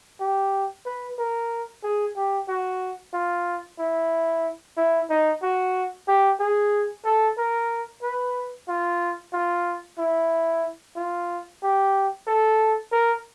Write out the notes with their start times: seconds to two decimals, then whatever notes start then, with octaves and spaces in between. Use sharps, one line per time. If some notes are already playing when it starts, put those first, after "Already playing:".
0.20 G4
0.86 B4
1.19 A#4
1.83 G#4
2.16 G4
2.48 F#4
3.13 F4
3.79 E4
4.77 E4
5.10 D#4
5.43 F#4
6.08 G4
6.40 G#4
7.05 A4
7.38 A#4
8.02 B4
8.68 F4
9.33 F4
9.99 E4
10.96 F4
11.62 G4
12.27 A4
12.92 A#4